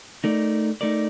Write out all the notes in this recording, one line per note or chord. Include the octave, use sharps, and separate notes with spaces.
A3 D#4 A#4 D5
A3 D#4 A#4 D5